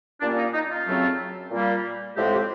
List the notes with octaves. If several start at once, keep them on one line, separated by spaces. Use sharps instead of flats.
A#2 G3 A#3 C#4 D4
D#4
D#4
F4
F#2 C#3 F#3 A3 C4
A#2 G3 A#3
A2 F3 G#3 C4 G4
G4